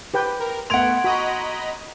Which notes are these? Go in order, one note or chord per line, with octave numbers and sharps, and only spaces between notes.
G4 B4 G5
A#4
A3 B3 F#5 C6 G#6 D7 F7
F#4 D#5 A#5 B5